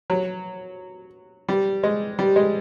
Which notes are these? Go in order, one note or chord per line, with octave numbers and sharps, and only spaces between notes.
F#3
G3
G#3
G3
G#3